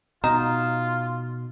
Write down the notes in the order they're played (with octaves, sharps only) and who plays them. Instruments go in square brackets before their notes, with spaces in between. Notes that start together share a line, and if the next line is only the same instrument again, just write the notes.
[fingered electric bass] B2 [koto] D#4 [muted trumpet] F4 [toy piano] A#5 D#6